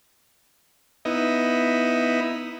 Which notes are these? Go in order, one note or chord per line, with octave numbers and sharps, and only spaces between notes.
B3 D#4 E4